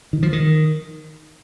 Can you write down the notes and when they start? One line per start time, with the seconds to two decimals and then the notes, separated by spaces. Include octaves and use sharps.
0.13 D#3
0.23 F3
0.33 D#3